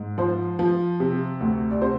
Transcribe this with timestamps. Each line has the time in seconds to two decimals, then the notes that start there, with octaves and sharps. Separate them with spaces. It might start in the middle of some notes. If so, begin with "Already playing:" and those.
Already playing: G#2
0.18 F3 C5
0.59 F3
1.00 C3
1.41 D2
1.71 D5
1.82 C3 C5